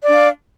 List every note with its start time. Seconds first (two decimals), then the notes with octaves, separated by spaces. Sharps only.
0.03 D5
0.07 D4
0.12 F5